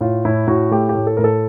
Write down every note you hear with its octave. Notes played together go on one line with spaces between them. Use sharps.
A2 F4
A2 E4
A2 F#4
A3 G4
G4
A2
A4
A2 A#4
A4